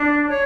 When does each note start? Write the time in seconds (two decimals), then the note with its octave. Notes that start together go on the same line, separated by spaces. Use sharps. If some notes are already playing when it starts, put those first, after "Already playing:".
Already playing: D4
0.29 C#5